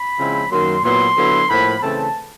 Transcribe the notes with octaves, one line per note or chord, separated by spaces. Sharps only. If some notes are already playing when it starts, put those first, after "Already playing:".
Already playing: B5
C#3 F3 G#3 C4 E4
F#2 D#3 F#3 A#3 C6
A#2 F#3 B3 E4 C6
D3 F#3 B3 E4
A2 F3 A#3 B5
C#3 E3 A3 C4 A5